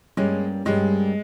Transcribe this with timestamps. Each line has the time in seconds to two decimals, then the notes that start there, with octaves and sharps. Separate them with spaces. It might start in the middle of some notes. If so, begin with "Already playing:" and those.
0.17 G2 G3 G#3 A#3 C#4
0.65 G2 G3 G#3 A#3 C#4